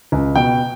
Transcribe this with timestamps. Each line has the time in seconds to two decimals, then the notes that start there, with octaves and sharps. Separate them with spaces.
0.12 C#2
0.36 B2 G5